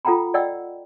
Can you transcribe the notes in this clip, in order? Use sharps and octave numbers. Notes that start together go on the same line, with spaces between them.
F4 A4 F#5 G5 A#5 B5
D5 D#5 F#5 G5 E6